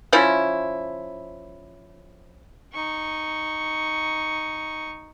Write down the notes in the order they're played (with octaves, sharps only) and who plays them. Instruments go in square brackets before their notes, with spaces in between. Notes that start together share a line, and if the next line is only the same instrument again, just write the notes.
[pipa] F3 C#4 E4
[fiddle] D#4 C#6